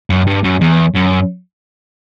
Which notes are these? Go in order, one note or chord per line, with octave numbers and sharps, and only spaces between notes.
F#2
G2
F#2
E2
F#2